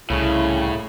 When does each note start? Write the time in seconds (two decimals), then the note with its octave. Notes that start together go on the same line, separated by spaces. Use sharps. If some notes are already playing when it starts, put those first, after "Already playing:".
0.10 C2 A2 C#3 E4